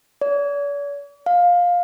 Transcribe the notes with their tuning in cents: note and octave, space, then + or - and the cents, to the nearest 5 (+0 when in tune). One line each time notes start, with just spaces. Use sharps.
D5 -45
F5 +15